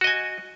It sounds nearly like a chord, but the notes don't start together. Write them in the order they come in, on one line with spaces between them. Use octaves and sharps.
F#4 D#5 G#5